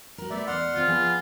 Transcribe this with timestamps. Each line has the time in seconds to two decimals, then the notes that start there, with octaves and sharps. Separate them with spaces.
0.18 F#4 A#4
0.30 A3 B3 D5 E5
0.47 E2 D5 F#5 C6 F6
0.76 D#2 C4 F4 C5
0.88 F3 B3 G#4